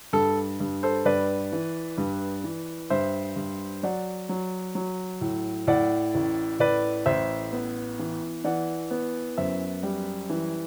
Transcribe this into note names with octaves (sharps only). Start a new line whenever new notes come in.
G2 A4
G2
A4 C5
G2 B4 D5
E3
G2
E3
G2 C5 E5
G2
F#3 D5 F#5
F#3
F#3
A2
A2 D5 F#5
A1
A2 B4 D5
A1 C5 E5
B3
E3
E3 D5 F#5
B3
F#2 C5 E5
G3
E3